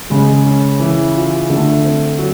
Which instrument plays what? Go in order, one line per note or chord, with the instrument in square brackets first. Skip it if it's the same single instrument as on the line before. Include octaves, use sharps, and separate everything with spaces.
[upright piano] C#3 [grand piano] G#3
[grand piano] C#4
E3
F4
[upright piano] D3 [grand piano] A3
[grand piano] C4
F#3